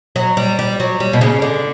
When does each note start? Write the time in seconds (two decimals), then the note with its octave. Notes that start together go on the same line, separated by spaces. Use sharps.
0.16 F#3
0.37 G3
0.59 G3
0.80 F#3
1.00 G3
1.13 B2
1.21 C#3
1.42 D3